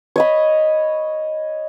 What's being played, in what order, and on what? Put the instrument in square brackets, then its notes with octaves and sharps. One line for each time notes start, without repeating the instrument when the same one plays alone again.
[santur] C#5 D#5 B5